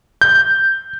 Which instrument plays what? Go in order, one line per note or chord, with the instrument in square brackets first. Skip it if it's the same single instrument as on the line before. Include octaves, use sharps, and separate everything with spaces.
[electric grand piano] G6